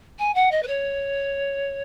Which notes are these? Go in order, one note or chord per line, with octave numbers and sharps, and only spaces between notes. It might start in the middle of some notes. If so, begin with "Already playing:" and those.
G#5
F#5
D#5
B4
C#5